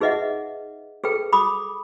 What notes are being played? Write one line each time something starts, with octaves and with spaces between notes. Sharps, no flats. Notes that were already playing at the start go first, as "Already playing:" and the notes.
D#4 G#4 B4 D#5 E5 F#5
G#4 A4 B4 G5
B5 D6 D#6